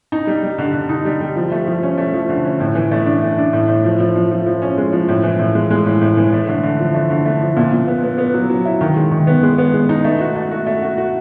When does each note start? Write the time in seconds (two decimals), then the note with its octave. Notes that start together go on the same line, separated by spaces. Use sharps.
0.12 D#4
0.27 G3
0.43 G3
0.58 D3
0.74 D3
0.89 D#4
1.05 G3
1.20 G3
1.36 F3
1.52 A3
1.67 F3
1.83 C#4
1.98 A3
2.14 F3
2.29 D3
2.45 C#4
2.60 A2
2.75 E3
2.91 A3
3.06 D4
3.22 A3
3.38 D4
3.53 A2
3.68 A2
3.84 F3
4.00 F3
4.15 F3
4.31 F3
4.46 F3
4.62 C#4
4.77 G#3
4.93 F3
5.08 A2
5.23 E3
5.39 A2
5.55 G#3
5.70 G#3
5.86 A2
6.01 A2
6.17 E3
6.32 A3
6.47 D3
6.63 D3
6.79 F3
6.94 A3
7.10 D3
7.26 A3
7.42 F3
7.56 A#2
7.72 A#2
7.87 B3
8.03 B3
8.18 B3
8.34 F#3
8.50 F#3
8.65 E4
8.81 D#3
8.96 G#3
9.11 D#3
9.27 B3
9.43 G#3
9.58 B3
9.74 G#3
9.89 D#4
10.04 A3
10.20 F#4
10.36 A3
10.51 F#4
10.67 A3
10.82 F#4
10.98 F#4